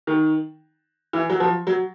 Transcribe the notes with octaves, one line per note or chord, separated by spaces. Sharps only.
D#3
E3
F#3
F3
F#3